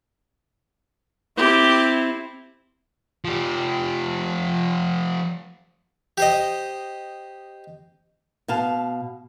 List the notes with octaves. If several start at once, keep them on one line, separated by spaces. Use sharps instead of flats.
C4 E4 G4
F3 G4
G4 C5 D#5
B2 F5 A5